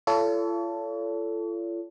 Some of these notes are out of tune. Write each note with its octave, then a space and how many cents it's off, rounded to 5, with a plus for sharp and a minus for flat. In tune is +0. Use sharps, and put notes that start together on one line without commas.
F4 -40 A4 +0 C#5 +40